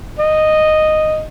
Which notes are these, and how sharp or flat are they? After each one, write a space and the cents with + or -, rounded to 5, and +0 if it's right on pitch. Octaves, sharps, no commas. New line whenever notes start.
D#5 -5